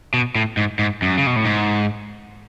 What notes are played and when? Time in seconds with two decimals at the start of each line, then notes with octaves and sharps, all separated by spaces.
0.14 B2
0.35 A2
0.57 G#2
0.79 G#2
1.02 F#2
1.18 C#3
1.27 B2
1.36 A2
1.45 G#2